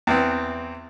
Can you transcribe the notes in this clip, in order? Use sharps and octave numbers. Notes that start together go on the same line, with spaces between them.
E2 E3 C4